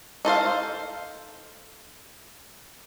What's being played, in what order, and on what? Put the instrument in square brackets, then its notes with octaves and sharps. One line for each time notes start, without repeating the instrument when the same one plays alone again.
[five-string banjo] D#4 A4 C5 F5